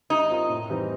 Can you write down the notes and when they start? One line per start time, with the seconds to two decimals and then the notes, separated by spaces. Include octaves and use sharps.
0.10 G3 D#4
0.30 C4 F4 A#4
0.49 A2
0.70 E3 G3 C4 D#4